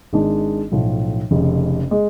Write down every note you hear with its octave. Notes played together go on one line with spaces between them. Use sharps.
G#1 G#2 G#3 D4
B1 A2 F3
F1 F2 C#3
G#3